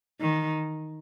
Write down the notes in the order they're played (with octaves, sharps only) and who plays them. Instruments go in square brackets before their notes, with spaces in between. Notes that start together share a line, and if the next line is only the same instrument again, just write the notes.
[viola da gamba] D#3